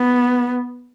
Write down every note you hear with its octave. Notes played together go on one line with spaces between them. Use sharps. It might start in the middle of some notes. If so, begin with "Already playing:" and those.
Already playing: B3